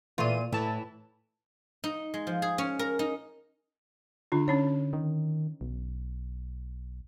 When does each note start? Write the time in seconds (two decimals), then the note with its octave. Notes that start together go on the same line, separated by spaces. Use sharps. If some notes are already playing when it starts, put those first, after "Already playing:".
0.18 A#2 E3 A3 F4 D#7
0.52 A2 E3 A5
1.84 D#4
2.14 G#3
2.27 F3
2.42 G#4
2.58 C#4
2.79 A#4
2.99 D#4
4.32 D3 D4 F4
4.48 D3 C#4 D#4 C#5
4.93 D#3
5.61 B1